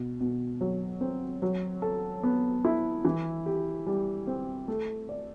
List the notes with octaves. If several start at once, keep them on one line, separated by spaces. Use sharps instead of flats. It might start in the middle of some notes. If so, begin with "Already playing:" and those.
Already playing: B2
B2
F#3
C4
F#3
A4
B3
E4
E3
G4
G3
C4
A3
D5